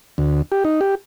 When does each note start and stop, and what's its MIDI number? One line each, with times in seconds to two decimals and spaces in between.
0.18 0.42 38
0.52 0.64 67
0.65 0.80 63
0.81 0.95 67